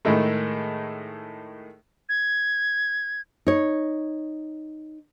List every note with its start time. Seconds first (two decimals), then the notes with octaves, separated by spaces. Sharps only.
0.05 A2 D#3 G#3 A3
2.09 G#6
3.47 D#4 C#5